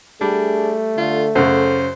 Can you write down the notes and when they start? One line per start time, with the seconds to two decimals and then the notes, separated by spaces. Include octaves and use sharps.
0.21 G3 A3 D4 G#4
0.98 D3 F4
1.35 F#2 C#3 A4 C5